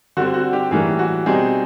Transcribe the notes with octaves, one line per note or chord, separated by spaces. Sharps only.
D3 G3 C4 F#4
F#4
G4
A2 E3 G3 A#3 G#4
F#4
B2 G3 C4 D#4 G#4